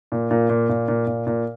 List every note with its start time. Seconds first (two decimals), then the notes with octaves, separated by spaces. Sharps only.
0.12 A#2
0.31 A#2
0.50 A#2
0.69 A#2
0.88 A#2
1.07 A#2
1.27 A#2